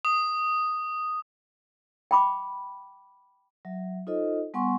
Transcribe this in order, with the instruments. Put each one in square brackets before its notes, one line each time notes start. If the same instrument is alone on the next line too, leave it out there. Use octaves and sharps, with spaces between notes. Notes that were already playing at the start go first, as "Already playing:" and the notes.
[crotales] D#6
[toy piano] G5 B5 D6
[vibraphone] F#3 E5
D#4 F4 A4 C5 D#5
G3 B3 F#5 G#5 C6 C#6